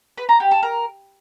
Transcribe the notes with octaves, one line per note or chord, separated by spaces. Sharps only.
B4
A#5
G4
A4
A#4